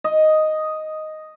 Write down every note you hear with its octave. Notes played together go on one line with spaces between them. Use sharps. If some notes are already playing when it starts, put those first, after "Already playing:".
D#5